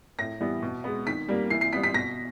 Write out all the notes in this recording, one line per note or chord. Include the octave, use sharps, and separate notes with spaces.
A2 A#6
E3 G3 B3
B2
G#3 B3
D#3 B6
G3 A#3
E3 C7
C7
G3 B3 B6
B6
B2 A#6